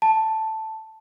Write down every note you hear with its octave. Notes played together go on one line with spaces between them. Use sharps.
A5